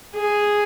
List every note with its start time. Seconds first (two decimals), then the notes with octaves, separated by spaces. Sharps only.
0.15 G#4